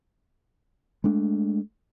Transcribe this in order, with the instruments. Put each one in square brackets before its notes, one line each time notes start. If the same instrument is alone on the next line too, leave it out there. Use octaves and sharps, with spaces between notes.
[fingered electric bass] G#3 A3 D4